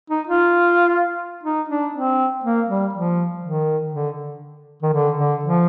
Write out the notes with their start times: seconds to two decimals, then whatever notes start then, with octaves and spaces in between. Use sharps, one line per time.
0.10 D#4
0.27 F4
1.43 D#4
1.69 D4
1.93 C4
2.44 A#3
2.68 G3
2.93 F3
3.43 D#3
3.93 D3
4.82 D#3
4.93 D3
5.17 D3
5.43 F3